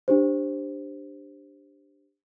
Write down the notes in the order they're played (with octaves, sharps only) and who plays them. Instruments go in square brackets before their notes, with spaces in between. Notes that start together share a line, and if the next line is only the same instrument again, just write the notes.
[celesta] D4 G4 C5